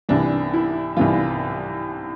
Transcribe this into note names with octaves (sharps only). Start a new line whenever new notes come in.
C2 C3 E3 D4
E4
C2 C3 E3 F4